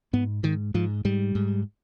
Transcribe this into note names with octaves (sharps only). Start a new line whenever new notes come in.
G#2 B3
G#2 D#3
G#2 F3
G#2 G3
G#2